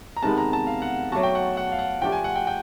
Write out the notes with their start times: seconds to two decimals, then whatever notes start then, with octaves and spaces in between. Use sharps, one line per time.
0.17 A#5
0.23 C3 D#3 G#3 B3 A5
0.38 A#5
0.53 A5
0.67 F5
0.82 F#5
1.12 F#3 A3 D4 F#4 A5
1.23 G5
1.35 F#5
1.57 F#5
1.72 F5
1.79 F#5
2.02 F3 A3 D4 G4 G5
2.12 G#5
2.24 F#5
2.36 G5
2.47 G5